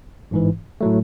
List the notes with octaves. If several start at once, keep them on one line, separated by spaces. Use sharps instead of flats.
A1 G#2 E3
A2 F#3 A3